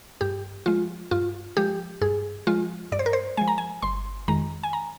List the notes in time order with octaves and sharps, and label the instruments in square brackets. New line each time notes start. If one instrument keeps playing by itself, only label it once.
[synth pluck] G2 G4
F3 G#3 F4
G2 F4
F3 G#3 G4
G2 G#4
F3 G#3 F4
G2 D5
C5
A#4
C5
F3 G#3 G#5
A#5
G#5
G1 C6
F2 D#3 G#3 A#5
G#5
A#5